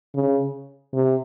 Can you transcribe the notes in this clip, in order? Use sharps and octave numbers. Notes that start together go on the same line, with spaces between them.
C#3
C3